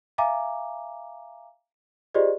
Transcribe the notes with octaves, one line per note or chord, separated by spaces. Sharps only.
E5 F5 G#5 A#5 D6
F4 G4 G#4 C5 D5 D#5